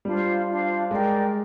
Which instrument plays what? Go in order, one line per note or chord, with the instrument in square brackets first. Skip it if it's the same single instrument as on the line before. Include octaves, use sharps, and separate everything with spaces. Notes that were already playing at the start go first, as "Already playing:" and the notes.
[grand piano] G3 [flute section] D4 F4 C5 F5
[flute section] D4 F4 C5 F5
[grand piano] G#3 [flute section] G4 A#4 D5 G5